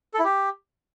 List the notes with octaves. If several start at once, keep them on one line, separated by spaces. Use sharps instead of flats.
A4
E4
G4